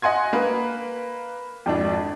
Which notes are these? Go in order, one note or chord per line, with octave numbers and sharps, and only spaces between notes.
D#5 F#5 G#5 C6 G#6
A#3 B4
G#1 F2 D4